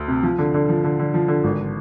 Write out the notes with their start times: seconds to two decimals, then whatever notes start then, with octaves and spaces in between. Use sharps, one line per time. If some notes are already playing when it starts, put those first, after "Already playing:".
Already playing: D2
0.08 C3
0.23 F3
0.38 D3
0.54 D3
0.69 F3
0.84 D3
0.99 D3
1.14 F3
1.28 D3
1.44 G#1